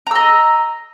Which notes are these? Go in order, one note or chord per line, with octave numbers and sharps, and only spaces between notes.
D#5 A#5 E6